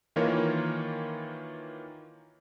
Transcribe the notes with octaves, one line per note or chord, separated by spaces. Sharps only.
D#3 E3 A#3 F4 A#4 C#5